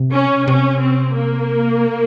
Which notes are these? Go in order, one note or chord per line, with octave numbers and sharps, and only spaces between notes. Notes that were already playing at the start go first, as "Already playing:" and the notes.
Already playing: C3
C#4
C3 C#4
C4
A#3